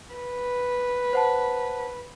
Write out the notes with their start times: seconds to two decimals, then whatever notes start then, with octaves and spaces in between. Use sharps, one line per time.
0.15 B4
1.13 C5 F#5 A5